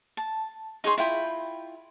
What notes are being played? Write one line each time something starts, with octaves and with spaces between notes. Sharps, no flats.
A5
D#4 G#4 C#5 C6
E4 F4 G5 B5